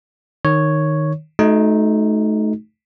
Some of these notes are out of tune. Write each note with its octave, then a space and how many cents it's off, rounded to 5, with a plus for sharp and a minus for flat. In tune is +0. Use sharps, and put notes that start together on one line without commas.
D#3 -10 C#5 +0
A3 -30 D#4 +0 F#4 -5